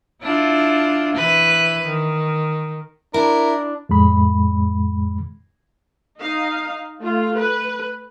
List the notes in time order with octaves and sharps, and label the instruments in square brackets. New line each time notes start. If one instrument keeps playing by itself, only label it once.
[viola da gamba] D4 E4 F4
E3 B4
D#3
[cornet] D4 [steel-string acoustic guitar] E4 [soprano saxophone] A#4
[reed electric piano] F2 A2 G#3 B5
[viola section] D#4 F5
A3 F4
B4